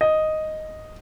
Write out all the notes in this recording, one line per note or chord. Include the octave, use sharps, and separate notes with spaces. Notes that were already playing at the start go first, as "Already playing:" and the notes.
D#5